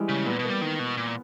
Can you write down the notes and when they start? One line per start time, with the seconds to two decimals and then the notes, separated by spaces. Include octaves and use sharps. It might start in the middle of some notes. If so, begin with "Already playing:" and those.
Already playing: E3 G3 G#3
0.09 C#3
0.26 A#2 B3
0.39 B2
0.44 A#3
0.49 G3
0.62 D#3
0.79 B2
0.97 A#2